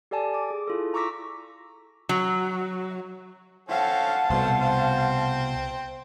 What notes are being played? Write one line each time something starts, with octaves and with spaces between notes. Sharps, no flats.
G4 A4 D5 G#5 A5
D6
G#4
E4 F4 A4
A#5 C#6 D6 E6 A#6 B6
F#3
C4 C#4 A4 F5 F#5 A5
C2 B2 A3 C5
C4 C5